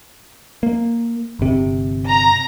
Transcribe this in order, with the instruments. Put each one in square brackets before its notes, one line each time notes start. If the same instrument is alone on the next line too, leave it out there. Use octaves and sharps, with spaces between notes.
[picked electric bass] A#3
G1 C3
[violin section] A#5